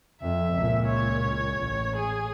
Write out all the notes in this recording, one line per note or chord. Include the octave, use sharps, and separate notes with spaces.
F2 E5
C#2 A#2
C#5
A1
G#4